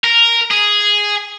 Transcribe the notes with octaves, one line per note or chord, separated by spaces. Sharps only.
A#4
G#4